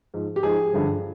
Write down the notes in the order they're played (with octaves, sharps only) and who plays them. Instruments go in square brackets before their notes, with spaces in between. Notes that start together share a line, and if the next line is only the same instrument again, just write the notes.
[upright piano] G#2 F3
G4
G#2 F3 G#4
G2 D3 F3